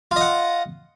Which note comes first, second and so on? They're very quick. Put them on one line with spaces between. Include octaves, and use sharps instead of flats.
F4 D#5 F#5